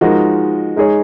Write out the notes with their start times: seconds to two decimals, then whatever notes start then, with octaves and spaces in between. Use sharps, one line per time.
0.01 F3 G#3 D#4 F#4 A#4
0.76 G#3 D#4 G#4 C#5